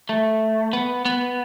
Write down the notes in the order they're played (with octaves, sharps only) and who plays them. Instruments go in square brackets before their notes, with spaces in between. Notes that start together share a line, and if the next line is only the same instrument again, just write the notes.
[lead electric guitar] A3
B3
B3